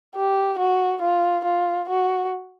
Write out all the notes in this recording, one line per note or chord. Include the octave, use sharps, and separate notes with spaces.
G4
F#4
F4
F4
F#4